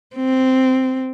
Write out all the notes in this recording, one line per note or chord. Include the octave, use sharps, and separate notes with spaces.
C4